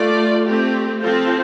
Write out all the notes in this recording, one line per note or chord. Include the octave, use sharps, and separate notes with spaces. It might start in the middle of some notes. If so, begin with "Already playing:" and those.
Already playing: A3 F4 D5
A3 C4 G4
F3 C4 F4 A4 C5